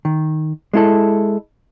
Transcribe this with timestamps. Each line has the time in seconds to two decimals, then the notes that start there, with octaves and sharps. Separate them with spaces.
0.05 D#3
0.73 G#3 E4 A4